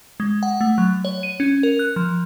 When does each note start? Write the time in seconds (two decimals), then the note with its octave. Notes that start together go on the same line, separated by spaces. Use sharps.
0.20 G#3
0.43 F#5
0.61 A3
0.78 F#3
1.05 C#5
1.23 D#7
1.40 C#4
1.63 A#4
1.79 F#6
1.96 F3